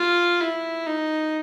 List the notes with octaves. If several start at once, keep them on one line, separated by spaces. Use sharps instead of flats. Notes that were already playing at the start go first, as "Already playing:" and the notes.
Already playing: F4
E4
D#4